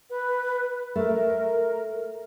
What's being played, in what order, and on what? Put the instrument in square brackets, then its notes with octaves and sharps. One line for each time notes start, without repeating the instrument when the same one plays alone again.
[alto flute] B4
[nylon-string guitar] A3 [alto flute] A#4